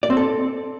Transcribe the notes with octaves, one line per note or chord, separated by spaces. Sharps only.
D5
C4
A4